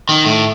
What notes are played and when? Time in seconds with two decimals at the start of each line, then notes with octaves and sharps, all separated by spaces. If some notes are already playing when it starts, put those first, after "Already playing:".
0.09 D#3
0.25 A2